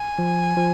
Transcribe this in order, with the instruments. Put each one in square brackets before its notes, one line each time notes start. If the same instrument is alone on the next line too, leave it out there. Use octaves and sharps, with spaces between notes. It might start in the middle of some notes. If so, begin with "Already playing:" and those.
Already playing: [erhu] G#5
[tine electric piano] F3
F3